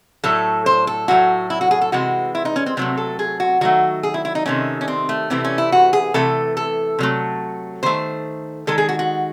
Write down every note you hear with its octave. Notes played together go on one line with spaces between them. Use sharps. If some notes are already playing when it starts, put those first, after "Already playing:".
A2 F#3 A3 A4
C5
A4
A2 F#3 A3 F#4
E4
F#4
G#4
A4
C3 E3 G#3 F#4
E4
D#4
C#4
C4
C3 F#3 A3 C4
A4
G#4
F#4
D#3 F#3 A3 F#4
G#4
E4
E4
D#4
C3 D#3 A3 C#4
C#4
C4
A3
C3 E3 A3 C4
C#4
E4
F#4
G#4
C3 E3 A3 A4
A4
C3 F#3 A3
D#3 A3 C5
D#3 G#3 A4
G#4
F#4
F#4